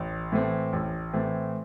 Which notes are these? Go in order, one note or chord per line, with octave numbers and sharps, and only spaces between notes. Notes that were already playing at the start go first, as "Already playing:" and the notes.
Already playing: A1
A2 E3 A3 C4
A1
A2 E3 A3 C4